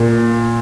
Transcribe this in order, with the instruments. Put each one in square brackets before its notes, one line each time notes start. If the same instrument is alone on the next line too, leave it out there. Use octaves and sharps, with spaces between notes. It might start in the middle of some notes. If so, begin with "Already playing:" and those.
Already playing: [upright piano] A#2